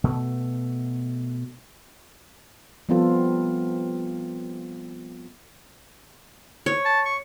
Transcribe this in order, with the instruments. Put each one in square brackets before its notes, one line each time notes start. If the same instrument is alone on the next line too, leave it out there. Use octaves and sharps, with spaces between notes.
[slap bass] B2 A3
[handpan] F3 G3 B3 C4 F4 A4
[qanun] C#5
[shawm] A5
C#6